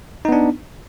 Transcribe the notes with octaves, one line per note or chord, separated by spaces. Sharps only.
B3 D4 D#4